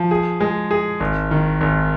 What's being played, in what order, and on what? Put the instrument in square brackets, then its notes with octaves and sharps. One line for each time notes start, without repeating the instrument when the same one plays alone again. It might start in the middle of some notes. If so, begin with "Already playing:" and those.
Already playing: [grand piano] F3
G#4
G#3
G#4
G#1
D#3
G#1